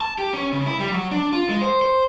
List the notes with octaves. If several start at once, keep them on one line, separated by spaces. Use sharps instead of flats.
A5
G4
C#4
C#3
E4
G3
F#3
D4
F4
G#3
C5
C5